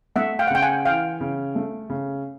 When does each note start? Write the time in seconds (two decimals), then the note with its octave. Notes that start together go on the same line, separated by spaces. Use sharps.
0.16 A3 E5 F#5
0.39 F5 G5
0.47 F#5
0.50 C#3 G5
0.62 F#5 G#5
0.85 E3 F5 G5
1.20 C#3
1.55 A3
1.90 C#3